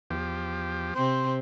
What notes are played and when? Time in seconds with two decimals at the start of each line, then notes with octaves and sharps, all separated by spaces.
0.11 E2 F3 G4
0.95 C3 C4 C5